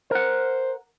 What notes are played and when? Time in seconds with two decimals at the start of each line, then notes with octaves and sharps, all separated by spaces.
0.11 A#4 C5 F#5